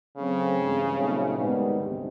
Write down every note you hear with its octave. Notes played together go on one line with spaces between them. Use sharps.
C#3 F#3 A3 C4
G2 E3 G#3
A#2 F#3 A3 C4 D#4
G#2 D#3 G3 B3 D#4
D2 C3